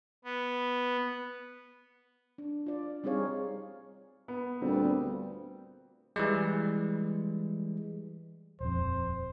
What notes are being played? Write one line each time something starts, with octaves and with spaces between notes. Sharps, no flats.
B3
D4
F4 D5
G3 C4 D#4 G#4 C#5 F5
B3
D2 A#2 G3 B3 C4
E3 G3 G#3
D#1 F2 C5